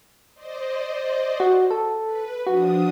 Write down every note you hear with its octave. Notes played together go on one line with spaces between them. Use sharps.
C5 D5 D#5
F#4
A4
B4
F3 D4 F#4 D#6